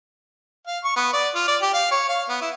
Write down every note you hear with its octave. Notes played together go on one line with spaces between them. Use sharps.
F5
C#6
B3
D5
F4
D5
G4
F5
C#5
F5
B3
E4